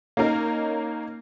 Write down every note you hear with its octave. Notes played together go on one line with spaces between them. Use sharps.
A#3 C#4 D#4 A#4